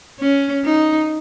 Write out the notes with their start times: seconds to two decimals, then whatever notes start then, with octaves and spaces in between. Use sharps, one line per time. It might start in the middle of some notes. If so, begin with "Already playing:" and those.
0.20 C#4
0.65 D#4